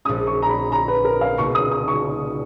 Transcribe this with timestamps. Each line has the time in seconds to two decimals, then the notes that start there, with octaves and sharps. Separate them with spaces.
0.05 A#1 A#2 G#3 C#4 D#6
0.27 C#6
0.42 A#5
0.49 B5
0.72 A#5
0.88 B4
1.05 A#4
1.21 F5
1.37 C#2 B2 A#3 D#4 C#6
1.55 D#6
1.71 D#6
1.88 C#6